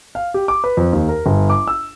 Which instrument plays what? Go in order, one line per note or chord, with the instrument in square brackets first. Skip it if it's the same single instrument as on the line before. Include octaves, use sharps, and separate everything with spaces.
[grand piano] F5
G4
D6
B4
F2
D#2
A#4
G1
D6
E6